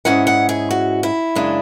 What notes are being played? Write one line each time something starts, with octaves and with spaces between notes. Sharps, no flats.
G#2 G#3 C#4 E4 F#5
F#5
G#4
F#4
E4
F#2 C#3 G#3 D4